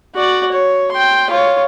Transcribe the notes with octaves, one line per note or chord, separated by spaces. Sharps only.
F#4 D5
C#5
G5 C6
F4 C#5